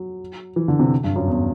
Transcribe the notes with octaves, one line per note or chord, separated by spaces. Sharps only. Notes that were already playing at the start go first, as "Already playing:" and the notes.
Already playing: F#3
E3
D3
C3
G2
F#2
E2